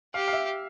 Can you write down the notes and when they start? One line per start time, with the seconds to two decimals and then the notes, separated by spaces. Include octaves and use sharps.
0.14 G4 F5
0.28 F5
0.33 E5